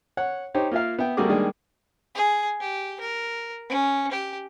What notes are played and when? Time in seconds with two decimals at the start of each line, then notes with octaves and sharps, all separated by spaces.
0.17 C#5 F#5
0.54 D#4 G4 C5 C#5
0.71 A#3 F4 A#4 E5 F5
0.99 B3 E5 G5
1.17 G3 A3 A#3 F#4 G#4 D6
1.29 D#3 G3 G#3 A#3 D4 G#4
2.15 G#4
2.60 G4
3.00 A#4
3.69 C#4
4.11 G4